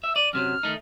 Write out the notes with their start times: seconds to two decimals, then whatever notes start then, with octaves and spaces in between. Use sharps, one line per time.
0.04 E5 E6
0.16 D5 D#7
0.33 F#2 C3 F#3 F6
0.63 D#3 A3 D#4